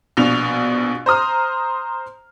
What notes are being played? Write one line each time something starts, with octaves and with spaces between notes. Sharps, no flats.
A#1 B2 F7
C5 A#5 D#6 F6